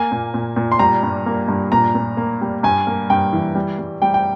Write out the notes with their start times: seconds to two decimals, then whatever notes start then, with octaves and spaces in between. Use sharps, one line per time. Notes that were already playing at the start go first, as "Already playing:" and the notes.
Already playing: A#3 G#5
0.12 A#2
0.34 A#2
0.56 A#2
0.72 C6
0.79 G3 A#5
1.03 G2
1.26 A#3
1.48 G2
1.72 A#2 A#5
1.95 A#2
2.17 A#3
2.41 G3
2.63 G2 G#5
2.87 A#3
3.10 G2 G5
3.33 E3
3.55 G3
3.79 G3
4.02 G3 G5
4.14 G5